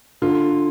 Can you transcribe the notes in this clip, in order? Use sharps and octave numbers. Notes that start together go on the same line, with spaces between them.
D3 F4